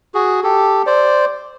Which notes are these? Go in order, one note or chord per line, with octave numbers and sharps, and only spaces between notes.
F#4 G#4
G4 A4
C5 D5